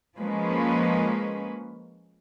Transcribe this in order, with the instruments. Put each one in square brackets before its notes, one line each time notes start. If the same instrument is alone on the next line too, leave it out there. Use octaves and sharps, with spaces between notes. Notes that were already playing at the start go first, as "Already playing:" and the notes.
[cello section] F3 G#3 A#3 C#4 B4